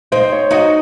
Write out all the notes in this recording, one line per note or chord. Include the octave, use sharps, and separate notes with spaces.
C4 D#4 C5
C#5
D#4 F#4 D#5